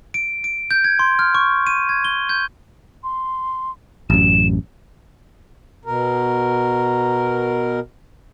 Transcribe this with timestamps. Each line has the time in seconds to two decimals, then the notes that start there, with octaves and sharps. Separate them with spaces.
0.14 D7
0.44 D7
0.71 G6
0.84 G#6
0.99 C6
1.19 F6
1.35 C#6
1.67 D#7
1.89 G#6
2.05 G7
2.29 G6
3.04 C6
4.10 A1 F#2 E7
5.85 B2 A#4